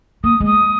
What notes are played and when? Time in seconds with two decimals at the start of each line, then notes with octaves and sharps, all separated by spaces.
0.24 A#3 D#6
0.40 G#3
0.46 D#6